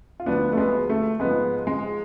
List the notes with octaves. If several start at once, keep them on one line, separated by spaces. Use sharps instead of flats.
F4
D2 D3 F3 B3 D4
A3
G#3 B3
A3
G#2 F3 G#3 B3
G#3